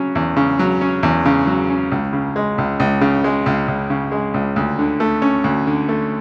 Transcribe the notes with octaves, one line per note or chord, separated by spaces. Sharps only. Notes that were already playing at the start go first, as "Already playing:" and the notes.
Already playing: C#3 F#3 C#4
E2
C#3
F#3
C#4
E2
C#3
F#3
C#4
C#2
C#3
G#3
C#2
C#2
C#3
G#3
C#2
C#2
C#3
G#3
C#2
D2
D3
A3
C#4
D2
D3
A3